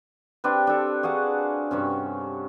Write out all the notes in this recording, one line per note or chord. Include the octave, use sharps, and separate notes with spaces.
C4 D4 G4 B4
D4 A4
F#4 G#4 F5 F#5
G2 C3 C#4